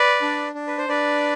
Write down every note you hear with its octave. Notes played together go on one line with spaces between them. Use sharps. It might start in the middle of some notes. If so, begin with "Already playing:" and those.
Already playing: B4 D5
D4
D4
B4
C5
D4 B4 D5